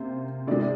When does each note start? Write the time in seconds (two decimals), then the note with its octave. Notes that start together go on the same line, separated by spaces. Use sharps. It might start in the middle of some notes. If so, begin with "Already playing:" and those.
Already playing: C3 A#3 C5
0.47 C3 D#3 G#3 D5